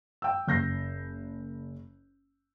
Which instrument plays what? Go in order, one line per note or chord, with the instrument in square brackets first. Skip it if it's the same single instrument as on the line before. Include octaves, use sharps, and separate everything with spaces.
[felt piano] G5 E6
F#1 G6 A#6 C7